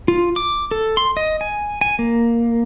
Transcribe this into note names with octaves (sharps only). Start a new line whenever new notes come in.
F4
D6
A4
C6
D#5
G#5
G#5
A#3